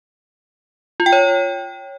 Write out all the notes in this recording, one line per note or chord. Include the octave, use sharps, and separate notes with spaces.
F4
G5
C#5